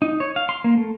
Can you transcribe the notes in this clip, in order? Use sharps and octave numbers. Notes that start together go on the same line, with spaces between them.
D#4
C#5
F5
C6
A#3
A3